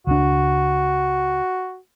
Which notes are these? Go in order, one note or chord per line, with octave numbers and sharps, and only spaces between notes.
C#2 D4 F#4